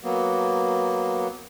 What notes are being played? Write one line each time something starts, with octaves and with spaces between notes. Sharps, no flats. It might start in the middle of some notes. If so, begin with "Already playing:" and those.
F#3 A#3 B3